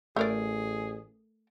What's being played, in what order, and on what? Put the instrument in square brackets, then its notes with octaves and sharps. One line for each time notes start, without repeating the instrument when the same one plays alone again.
[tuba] A1 [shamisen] A3 A#4 D5 [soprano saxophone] G#4